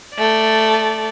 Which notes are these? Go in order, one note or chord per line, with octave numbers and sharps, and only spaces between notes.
A3 D5